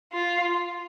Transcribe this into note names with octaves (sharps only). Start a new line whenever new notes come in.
F4